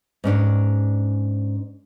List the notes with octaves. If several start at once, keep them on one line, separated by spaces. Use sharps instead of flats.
G#2 C#4 D4